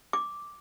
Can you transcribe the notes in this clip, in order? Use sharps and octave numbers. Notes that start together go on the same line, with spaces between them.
D6